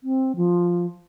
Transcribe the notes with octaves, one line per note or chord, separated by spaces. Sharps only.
C4
F3